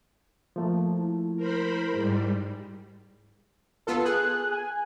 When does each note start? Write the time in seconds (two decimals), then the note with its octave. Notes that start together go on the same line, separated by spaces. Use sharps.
0.56 F3 A3 A#3
0.96 E4
1.36 A#4 C5 B5
1.93 G#2 G3 G#3
3.87 B3 F4 A4
4.05 G#4 F#6
4.52 G#5